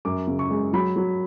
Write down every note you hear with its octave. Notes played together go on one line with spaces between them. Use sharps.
F#2 D6
C#3
C#6
G#3
F#3 B5
F#3